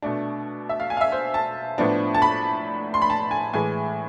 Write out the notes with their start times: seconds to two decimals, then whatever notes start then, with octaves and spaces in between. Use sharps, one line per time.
0.02 B2 A3 D4
0.69 E5
0.80 F5
0.90 G#5
0.97 F5
1.01 E5
1.12 C5
1.34 A5
1.78 A2 F3 B3 D4
2.15 A5
2.22 B5
2.94 C6
3.02 B5
3.10 A5
3.31 G#5
3.53 A2 E3 G#3 G#5